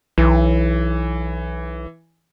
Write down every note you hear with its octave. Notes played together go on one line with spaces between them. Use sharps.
B1 E3